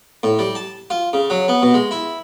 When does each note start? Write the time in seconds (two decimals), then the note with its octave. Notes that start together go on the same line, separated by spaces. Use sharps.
0.23 A2
0.39 G3
0.55 A5
0.90 F4
1.13 C#3
1.30 F#3
1.48 B3
1.62 B2
1.74 G#3
1.91 E4